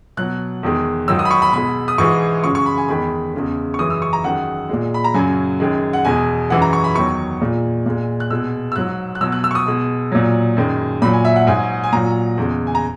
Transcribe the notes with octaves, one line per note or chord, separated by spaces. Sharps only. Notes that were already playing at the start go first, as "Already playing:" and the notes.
B2 F#3 F#6
E2 D#3 G#3
G#2 D#3 F#3 E6
D#6
B5
C#6
B5
B2 G#3 B5
D#6
G#2 E3 G#3 C#6
F#2 C#3 G#3 C#6
C#6
B5
G#5
E2 D#3 G#3 B5
E2 C#3 G#3
C#6
F#2 C#3 E3 G#3 D#6
E6
C#6
A#5
F#2 D#3 G#3 F#5
A#2 G#3
B5
A#5
F#2 C#3 F#3 G#5
F#2 D#3 G#3
F#5
E2 B2 G#3 G#5
F#2 E3 G#3 F#5
A#5
C#6
B5
E2 D#3 F#3 C#6
A#2 G#3
A#2 G#3
F#6
B2 G#3 E6
E6
G#2 F#3 F#6
F#6
B2 F#3 E6
F#6
E6
C#6
D#6
B2 G#3
A#2 F#3
F#2 D#3 G#3
A#2 F#3 B5
G#5
E5
F#5
G#2 F#3 G#5
G#5
A#2 F#3 A#5
E2 C#3 G#3
G#5
A#5